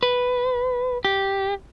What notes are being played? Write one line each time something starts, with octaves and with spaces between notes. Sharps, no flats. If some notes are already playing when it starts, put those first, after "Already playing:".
B4
G4